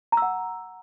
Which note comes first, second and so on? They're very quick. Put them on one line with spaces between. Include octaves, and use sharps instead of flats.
A#5 E6 F#5